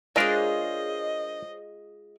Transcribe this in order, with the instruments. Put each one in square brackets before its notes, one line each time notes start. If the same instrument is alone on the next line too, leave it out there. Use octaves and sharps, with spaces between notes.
[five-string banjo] G#3 F4 [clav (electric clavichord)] D4 A#4 [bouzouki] G#4 C5 C#5 [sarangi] D#5